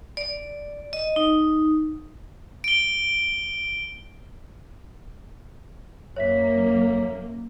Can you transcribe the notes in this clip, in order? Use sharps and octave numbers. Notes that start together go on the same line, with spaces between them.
D5
D#5
D#4
D7 G7
F#2 A#3 C#5 E5 B6